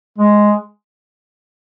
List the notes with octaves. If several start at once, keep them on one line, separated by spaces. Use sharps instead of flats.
G#3